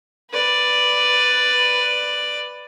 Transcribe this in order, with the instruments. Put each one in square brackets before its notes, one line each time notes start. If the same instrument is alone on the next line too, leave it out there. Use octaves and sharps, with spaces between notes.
[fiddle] B4 D5